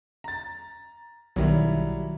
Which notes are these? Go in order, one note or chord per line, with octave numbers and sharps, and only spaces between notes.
A#5 A6
B1 D#3 F#3 G3 E4